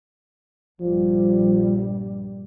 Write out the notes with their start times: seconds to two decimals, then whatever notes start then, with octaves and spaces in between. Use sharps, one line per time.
0.81 A#1 G2 F3 G3